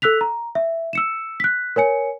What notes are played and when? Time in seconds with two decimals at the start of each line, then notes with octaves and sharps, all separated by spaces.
0.02 A4 E6 F#6 B6 F7
0.21 A#5
0.55 E5
0.93 E6 C#7 E7
1.40 F#6 B6
1.76 A#4 C#5 G#5 C#7